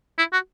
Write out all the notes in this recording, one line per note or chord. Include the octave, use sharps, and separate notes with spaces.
E4
F#4